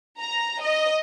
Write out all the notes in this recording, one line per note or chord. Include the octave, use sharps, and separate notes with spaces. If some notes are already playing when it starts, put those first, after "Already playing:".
A#5
D#5